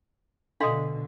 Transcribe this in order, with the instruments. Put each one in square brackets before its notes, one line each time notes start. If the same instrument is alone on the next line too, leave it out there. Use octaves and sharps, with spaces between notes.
[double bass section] B2 D3 [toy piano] D4 F5 C6 [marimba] A4 D#5 D#6